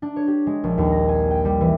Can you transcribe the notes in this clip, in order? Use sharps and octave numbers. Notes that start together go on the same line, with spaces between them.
D4
C#5
G4
G#3
A#1
D#2
A#6
G#5
G5
G3
E3